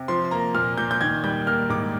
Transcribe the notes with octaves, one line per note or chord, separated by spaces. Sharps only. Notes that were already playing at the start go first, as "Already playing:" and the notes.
Already playing: C3
F3 C6
A#3 A#5
A#2 F6
A#2 G6
G6
D#3 G#6
G3 G6
A#3 F6
G#2 D6